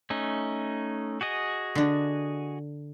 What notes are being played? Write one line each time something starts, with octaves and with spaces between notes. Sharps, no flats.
A3 C#4 D#4
F#4 G#4 D#5
D3 D4